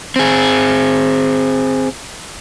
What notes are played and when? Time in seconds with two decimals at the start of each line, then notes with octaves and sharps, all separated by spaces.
0.16 C4 G#4